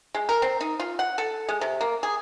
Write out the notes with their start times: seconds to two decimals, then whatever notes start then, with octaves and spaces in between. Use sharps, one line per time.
0.14 G#3
0.29 A#4
0.42 C4
0.61 D#4
0.80 F4
0.99 F#5
1.18 A4
1.49 G#3
1.61 C3
1.81 A#3
2.03 G#4